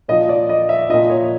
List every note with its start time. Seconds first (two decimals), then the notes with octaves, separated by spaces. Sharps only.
0.08 A#2 F3 D#5
0.29 D5
0.49 D#5
0.69 E5
0.89 F3 D#5
0.93 A#2
1.10 C#5